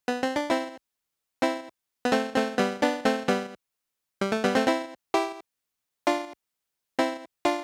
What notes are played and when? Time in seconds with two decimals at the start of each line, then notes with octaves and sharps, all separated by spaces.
0.08 B3
0.23 C4
0.36 D4
0.50 C4 E4
1.42 C4 E4
2.05 B3
2.12 A3 C4
2.35 A3 C4
2.58 G3 B3
2.82 B3 D4
3.05 A3 C4
3.28 G3 B3
4.21 G3
4.32 A3
4.44 G3 B3
4.55 A3 C4
4.67 C4 E4
5.14 E4 G4
6.07 D4 F4
6.99 C4 E4
7.45 D4 F4